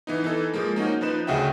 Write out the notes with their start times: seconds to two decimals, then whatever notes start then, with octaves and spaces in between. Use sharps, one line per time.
0.07 E3 B3 D#4
0.24 E3 D#4 A4
0.54 F3 G#3 A#3
0.76 A#3 C#4 D#4 F#4
1.01 F3 D#4 B4 E7
1.27 D2 C#3 F#4 D#5 E5 G5